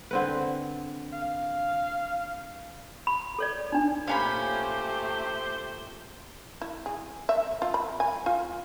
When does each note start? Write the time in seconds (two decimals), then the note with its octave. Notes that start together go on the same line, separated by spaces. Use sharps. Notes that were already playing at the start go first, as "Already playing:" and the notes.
0.11 D3 C4 B4
1.12 F5
3.07 B5
3.39 A4 C#5 D5
3.70 D4 D#4 D5
4.07 A#2 A3 C#4 G4 C5 F5 G#5 B5
6.61 E4
6.86 G#4
7.29 E5
7.62 F4
7.74 B5
8.00 G#5
8.26 F4